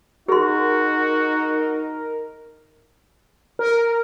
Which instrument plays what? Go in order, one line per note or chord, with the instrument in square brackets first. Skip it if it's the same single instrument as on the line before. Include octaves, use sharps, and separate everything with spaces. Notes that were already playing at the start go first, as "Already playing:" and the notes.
[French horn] D#4 [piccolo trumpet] F#4 [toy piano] G#4 C6 [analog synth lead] A#4
[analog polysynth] A#4